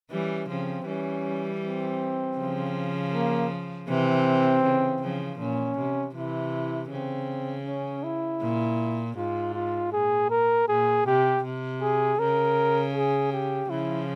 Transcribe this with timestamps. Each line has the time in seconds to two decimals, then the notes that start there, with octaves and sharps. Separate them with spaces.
0.11 E3 G3 C#4
0.49 C#3 F3 C4
0.87 E3 G3 C#4
1.62 C4
2.38 C#3 F3
3.14 A#3
3.88 C3 E3 C4
4.64 C#3
5.02 C#3 F3
5.39 A#2 C#4
5.78 C3
6.15 C3 E3 E4
6.91 C#3 C4
7.66 C#4
8.03 E4
8.42 A#2
9.17 G#2 F4
9.55 F4
9.92 A#2 G#4
10.30 A#4
10.68 A#2 G#4
11.06 C3 G4
11.43 C3
11.82 G#4
12.19 C#3 A#4
12.95 G#4
13.33 G4
13.70 C#3 F3 E4